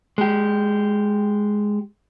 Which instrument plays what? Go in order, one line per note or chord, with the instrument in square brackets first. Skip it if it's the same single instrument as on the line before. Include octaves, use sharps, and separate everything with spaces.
[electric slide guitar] G#3 G4